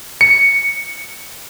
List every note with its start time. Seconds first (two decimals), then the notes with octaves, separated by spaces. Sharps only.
0.21 C#7